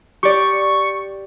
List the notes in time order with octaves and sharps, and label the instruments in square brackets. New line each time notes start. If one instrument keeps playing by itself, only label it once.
[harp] G4 D5 [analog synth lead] C#6